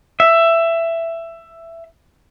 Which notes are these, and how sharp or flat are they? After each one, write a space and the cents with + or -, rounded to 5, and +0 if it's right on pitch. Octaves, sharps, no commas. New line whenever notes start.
E5 +15